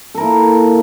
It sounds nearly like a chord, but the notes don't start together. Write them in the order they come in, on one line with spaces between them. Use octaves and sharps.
A4 A#4 E4 A#3